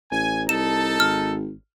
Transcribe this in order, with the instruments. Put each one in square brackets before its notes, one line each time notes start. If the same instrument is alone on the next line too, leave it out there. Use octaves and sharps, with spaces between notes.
[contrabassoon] A1 [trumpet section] G#5
[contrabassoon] C2 [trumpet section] D#4 A4 A5 [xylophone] E7
[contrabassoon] G#1 [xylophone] F6